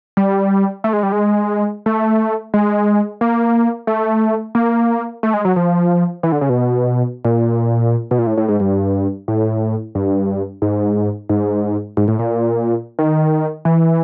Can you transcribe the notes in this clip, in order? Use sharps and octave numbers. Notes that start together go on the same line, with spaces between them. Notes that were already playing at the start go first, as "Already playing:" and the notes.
G3
A3
G#3
G3
G#3
A3
G#3
A#3
A3
A#3
A3
G#3
F#3
F3
E3
D3
C#3
B2
A#2
B2
A#2
A2
A2
G#2
G2
A2
G2
G#2
G#2
G#2
A2
A#2
D#3
E3